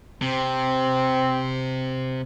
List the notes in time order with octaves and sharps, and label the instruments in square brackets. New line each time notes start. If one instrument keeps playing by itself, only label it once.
[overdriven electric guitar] C3 [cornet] C4